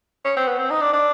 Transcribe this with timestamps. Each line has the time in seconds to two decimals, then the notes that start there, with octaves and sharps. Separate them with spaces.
0.25 C#4
0.37 C4
0.47 B3
0.59 C4
0.70 D#4
0.81 D4
0.93 D4